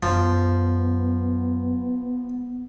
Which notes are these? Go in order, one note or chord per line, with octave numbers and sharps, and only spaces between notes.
F#2 F3 B3